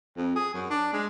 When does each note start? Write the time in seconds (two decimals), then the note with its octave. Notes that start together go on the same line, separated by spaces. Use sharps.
0.17 F2
0.36 G#4
0.54 F#2
0.70 D4
0.93 G#3